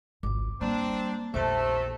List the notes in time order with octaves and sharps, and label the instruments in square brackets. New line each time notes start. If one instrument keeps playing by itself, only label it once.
[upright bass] G#1 C#2 [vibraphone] D6
[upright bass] G3 [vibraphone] A#3 [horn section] C4 D4
[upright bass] A#1 E2 [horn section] C3 A3 A4 [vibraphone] C5 A5